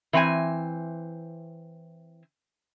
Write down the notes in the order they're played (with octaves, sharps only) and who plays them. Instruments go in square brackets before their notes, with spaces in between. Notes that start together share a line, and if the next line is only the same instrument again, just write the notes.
[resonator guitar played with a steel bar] E3 C4 G5 G#5